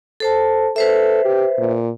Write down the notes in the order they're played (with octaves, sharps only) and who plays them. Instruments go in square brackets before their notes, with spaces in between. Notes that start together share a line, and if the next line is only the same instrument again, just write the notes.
[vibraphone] A4 C5 A5
[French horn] A4 [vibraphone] B4 C5 E5
[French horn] G4
A#2